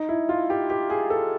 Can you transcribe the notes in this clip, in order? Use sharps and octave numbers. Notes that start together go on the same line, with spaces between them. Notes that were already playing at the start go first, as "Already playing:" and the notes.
Already playing: D#4
E4
F4
G4
G4
G#4
A4